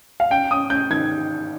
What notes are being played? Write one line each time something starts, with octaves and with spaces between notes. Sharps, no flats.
F5
C#4 G5
C#4 D#6
C#4 G6
D#3 G#6